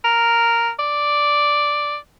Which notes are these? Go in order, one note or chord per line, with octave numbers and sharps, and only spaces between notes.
A#4
D5